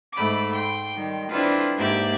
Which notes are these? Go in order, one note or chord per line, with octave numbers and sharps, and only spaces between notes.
G#2 A3 B5 D6
G5 C6
D#3 G3
C4 D4 E4 F4 A4 B4
G#2 A#3 G4 D5 E5